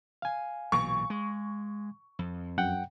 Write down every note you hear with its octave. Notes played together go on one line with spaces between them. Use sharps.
F5 G#5
B1 A#2 E3 C#6
G#3
F2
F#2 F#5 G5